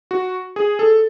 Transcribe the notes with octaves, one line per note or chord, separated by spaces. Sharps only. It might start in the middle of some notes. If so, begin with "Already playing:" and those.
F#4
G#4
A4